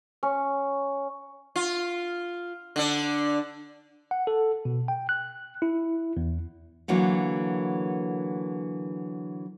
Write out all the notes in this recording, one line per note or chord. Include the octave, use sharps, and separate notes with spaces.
C#4
F4
D3 D4
F#5
A4
B2
G5
F#6
E4
E2
D3 E3 F#3 A#3